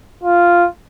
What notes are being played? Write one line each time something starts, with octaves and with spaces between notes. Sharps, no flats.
F4